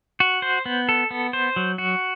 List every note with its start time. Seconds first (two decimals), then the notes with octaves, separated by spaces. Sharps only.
0.20 F#4
0.42 C5
0.66 B3
0.89 A4
1.11 B3
1.33 C5
1.56 F#3
1.78 F#4